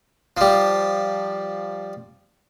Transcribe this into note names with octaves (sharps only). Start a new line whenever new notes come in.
F3 G3